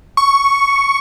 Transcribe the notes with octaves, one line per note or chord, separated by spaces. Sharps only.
C#6